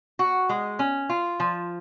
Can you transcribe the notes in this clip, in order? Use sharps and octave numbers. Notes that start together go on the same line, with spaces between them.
F#4
G#3
C#4
F4
F3